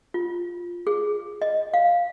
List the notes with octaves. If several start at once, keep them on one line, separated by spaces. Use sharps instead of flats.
F4
G#4
D#5
F5